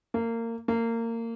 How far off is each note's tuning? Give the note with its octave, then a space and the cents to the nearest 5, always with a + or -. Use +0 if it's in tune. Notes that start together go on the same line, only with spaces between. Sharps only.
A#3 -25
A#3 -25